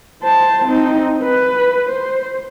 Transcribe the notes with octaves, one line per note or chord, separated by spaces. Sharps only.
C5 A5
C4 D#4
B4
C5